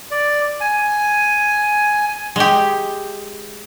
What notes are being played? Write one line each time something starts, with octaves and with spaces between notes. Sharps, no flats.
D5
G#5
G#3 G4